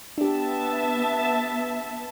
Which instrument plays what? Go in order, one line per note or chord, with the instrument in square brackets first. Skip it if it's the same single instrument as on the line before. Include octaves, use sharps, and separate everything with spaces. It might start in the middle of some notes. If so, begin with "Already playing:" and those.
[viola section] B3 E5 A5 [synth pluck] D4 G4